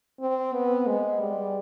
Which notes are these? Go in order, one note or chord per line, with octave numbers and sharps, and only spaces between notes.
C4
B3
G#3
G3